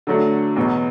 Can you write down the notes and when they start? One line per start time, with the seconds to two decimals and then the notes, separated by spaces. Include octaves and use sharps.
0.07 D3 F#3 A3 D4
0.56 E2 B2 F#3 B3